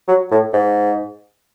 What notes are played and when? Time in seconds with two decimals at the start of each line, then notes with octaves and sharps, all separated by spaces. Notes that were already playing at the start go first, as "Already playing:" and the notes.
0.08 F#3
0.31 A2
0.53 G#2